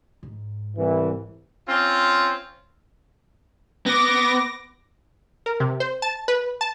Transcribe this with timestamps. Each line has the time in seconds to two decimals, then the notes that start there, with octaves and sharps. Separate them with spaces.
0.23 G#2
0.77 C2 E3
1.67 C4 C#4 F4
3.86 B3 D6 A#6
5.46 A#4
5.60 C3
5.80 C5
6.02 A5
6.28 B4
6.61 A5